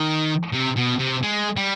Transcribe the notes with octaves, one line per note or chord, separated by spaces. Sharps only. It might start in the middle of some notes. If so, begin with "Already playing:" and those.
Already playing: D#3
C3
B2
C3
G#3
G3